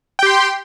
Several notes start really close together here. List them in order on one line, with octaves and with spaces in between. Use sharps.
G5 G4 C6